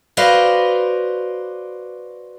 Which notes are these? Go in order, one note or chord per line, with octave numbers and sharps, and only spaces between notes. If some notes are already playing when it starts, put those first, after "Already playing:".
F#4 B4 C5 D5 D#5 F5